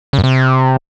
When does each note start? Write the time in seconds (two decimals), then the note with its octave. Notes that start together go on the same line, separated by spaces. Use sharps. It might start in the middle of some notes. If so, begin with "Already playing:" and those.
0.13 C#3
0.18 F#2
0.24 C3